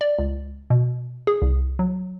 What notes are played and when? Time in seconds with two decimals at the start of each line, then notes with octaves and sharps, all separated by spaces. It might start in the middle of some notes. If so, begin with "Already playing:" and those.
0.01 D5
0.19 C#2
0.70 B2
1.27 G#4
1.42 C2
1.79 F#3